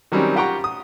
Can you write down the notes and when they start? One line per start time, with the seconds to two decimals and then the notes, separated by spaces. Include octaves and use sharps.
0.12 D#3 F#3 G3 C4 C#4
0.36 F4 G4 F#5 G5 A#5 C#6
0.64 D#6